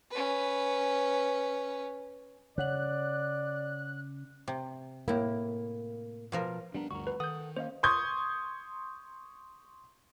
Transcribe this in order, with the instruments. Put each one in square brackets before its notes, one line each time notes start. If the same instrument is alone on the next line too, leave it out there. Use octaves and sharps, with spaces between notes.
[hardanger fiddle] C#4 B4
[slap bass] C#3 [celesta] C#5 F#5 F#7 [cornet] D5 [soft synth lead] F#6
[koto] C3
[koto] A2 E4 [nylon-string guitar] A#3
[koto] B2 F3 A#4
[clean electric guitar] G3 B3 A#4 [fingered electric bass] D4
[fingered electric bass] D2 G2 [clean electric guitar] F#4 A#4 [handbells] C#6
[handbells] B4
[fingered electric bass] D#3 [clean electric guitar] A4 F#5 [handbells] D#6 G6
[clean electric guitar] A#3 C#4 [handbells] C5 D#5 F5
[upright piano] C6 C#6 D#6 G6 G#6